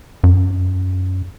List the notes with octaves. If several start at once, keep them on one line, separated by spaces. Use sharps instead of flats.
F#2